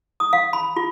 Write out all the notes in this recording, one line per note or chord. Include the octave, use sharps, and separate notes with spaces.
D#6
F5
B5
F4